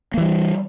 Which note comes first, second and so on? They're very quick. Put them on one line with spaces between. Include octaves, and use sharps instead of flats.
A#3 E3 G3